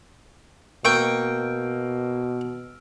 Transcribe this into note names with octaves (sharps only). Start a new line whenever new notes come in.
B2 A#3 G5 C#6 E6 F6 D7